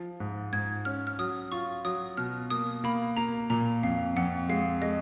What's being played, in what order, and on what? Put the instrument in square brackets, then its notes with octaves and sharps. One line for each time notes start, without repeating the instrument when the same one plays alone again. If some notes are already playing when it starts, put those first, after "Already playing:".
Already playing: [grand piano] F3
G#2
[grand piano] G#2 [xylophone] G#6
[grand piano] C#4 [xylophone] F6
[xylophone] F6
[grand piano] F#3 [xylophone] D#6
[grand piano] F4 [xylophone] C#6
[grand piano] F#3 [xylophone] D#6
[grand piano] B2 [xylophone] F6
[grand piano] A#3 [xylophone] D#6
[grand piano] A#3 [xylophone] B5
[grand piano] A#3 [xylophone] A#5
[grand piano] A#2 [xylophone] A#5
[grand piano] F2 [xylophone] F5
[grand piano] F2 [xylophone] F#5
[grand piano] G#3 [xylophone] F5
[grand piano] G#3 [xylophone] D#5